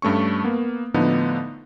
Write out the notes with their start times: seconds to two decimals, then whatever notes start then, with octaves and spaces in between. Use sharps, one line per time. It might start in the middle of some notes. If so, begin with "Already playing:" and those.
0.02 G2 A3 C#4 C#6
0.44 A#3 B3
0.94 A2 D3 F3 B3 D4 D#4